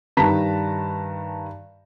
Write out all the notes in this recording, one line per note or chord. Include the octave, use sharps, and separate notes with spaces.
G2 D#3 B4 A5 A#5 B6